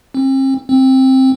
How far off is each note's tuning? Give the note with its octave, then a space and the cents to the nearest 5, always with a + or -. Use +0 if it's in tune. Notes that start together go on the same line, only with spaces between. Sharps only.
C4 +40
C4 +10